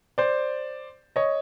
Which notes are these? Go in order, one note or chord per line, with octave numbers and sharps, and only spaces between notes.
C5 D5
C#5 D#5